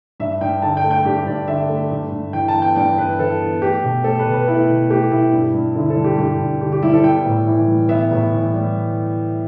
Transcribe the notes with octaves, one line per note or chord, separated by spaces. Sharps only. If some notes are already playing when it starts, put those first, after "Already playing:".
G2 E5
G2 G5
D3 A5
G5
A3
G5
G2 G4
G2 D5
D3 E5
A3
G2
G2
E3 G5
A5
B3
G5
G2 G5
G2 B4
E3 A4
B3
A3 G4
B2
A3 A4
B4
B2
B4
A3 E4
B2
A3 G4
B2 E4
G2
G2
D3 E4
A4
G3
G4
G2 G4
G2
D3 G4
G4
G3 E4
A4
B3 G5
A2
E3
G3
B3 E5
A2
E3
G3